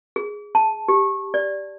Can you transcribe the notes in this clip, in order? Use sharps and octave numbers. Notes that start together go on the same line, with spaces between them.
G#4
A5
G4
D5